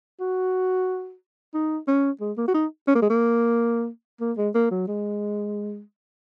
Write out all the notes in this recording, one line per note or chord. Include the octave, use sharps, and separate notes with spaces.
F#4
D#4
C#4
G#3
A#3
F#4
D#4
C#4
A#3
G#3
A#3
A#3
G#3
A#3
F#3
G#3